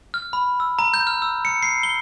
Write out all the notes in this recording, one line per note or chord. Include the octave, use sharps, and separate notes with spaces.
F6
B5
E6
A#5
G6
F6
E6
C#7
C7
G7